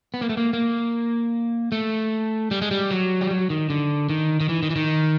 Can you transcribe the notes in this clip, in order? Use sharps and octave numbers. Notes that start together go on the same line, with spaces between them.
B3
A#3
A3
A#3
A#3
A3
G3
G#3
G3
F#3
G3
F#3
D#3
D3
D#3
D#3
E3
D#3
E3
D#3